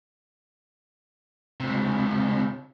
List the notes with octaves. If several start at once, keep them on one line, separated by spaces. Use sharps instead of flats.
C#2 C3